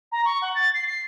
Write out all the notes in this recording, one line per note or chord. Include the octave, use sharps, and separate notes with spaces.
A#5
C#6
F#5
A6
C7
C7